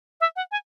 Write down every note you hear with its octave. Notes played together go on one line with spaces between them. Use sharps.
E5
F#5
G#5